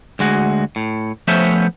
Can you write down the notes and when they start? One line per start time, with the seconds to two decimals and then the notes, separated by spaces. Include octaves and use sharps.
0.19 D2 G#3 F#4
0.76 A2
1.28 F3 A3 B3 C#4 C5 E5